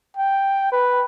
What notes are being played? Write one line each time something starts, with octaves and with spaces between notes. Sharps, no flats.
G5
B4